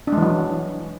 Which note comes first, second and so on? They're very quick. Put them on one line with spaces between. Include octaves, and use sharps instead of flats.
D4 G#3 E3 F#3